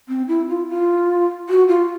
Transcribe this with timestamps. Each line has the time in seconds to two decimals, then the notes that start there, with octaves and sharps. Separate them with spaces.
0.09 C4
0.28 E4
0.49 F4
0.69 F4
1.49 F#4
1.68 F4